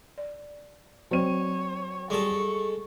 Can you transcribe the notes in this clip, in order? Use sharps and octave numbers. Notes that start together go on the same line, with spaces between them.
D5
F#3 C4 C#5 D5 D#7
G3 G#3 F#4 G4 A4 C#6